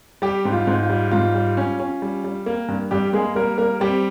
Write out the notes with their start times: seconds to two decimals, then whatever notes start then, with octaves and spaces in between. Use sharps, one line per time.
0.22 G3 G4
0.45 G#2
0.52 F4
0.67 G#2
0.83 F4
0.90 G3
1.11 G#2 F4
1.35 G3
1.57 C#4
1.80 C#4
2.02 G3
2.24 G3
2.46 A#3
2.68 G2
2.91 G2 G3 G4
3.13 G#3 A#3 G#4
3.35 G3 A#3 A#4
3.58 G3 A#3 A#4
3.80 G3 C4 G4